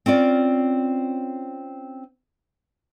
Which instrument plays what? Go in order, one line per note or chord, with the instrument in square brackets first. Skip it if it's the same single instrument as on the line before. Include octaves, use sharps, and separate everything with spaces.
[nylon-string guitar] C4 C#4 F4 D5